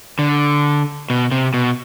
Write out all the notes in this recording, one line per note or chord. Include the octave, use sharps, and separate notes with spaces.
D3
B2
C3
B2